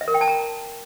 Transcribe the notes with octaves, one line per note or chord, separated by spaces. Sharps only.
E5
A#4
G5
A5
A#5